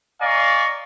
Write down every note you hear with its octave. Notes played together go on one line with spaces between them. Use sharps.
D5 D#5 F5 G#5 A#5 C#6